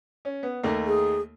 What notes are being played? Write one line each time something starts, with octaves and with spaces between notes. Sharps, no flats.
C#4
B3
D#2 A3 A#3
G#4